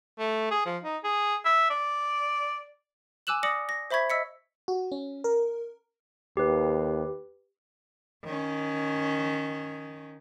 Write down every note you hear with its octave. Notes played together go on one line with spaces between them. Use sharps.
A3
G#4
F3
D#4
G#4
E5
D5
G#5 D6 E6 F#6 E7 F#7
D5 D6 D#6 A#6 C#7 F#7
A#6
C5 E5 B5 C#6 G#6 B6
D#5 E6 B6 C#7
F#4
C#4
A#4
D#2 G4 B4
D#3 C#4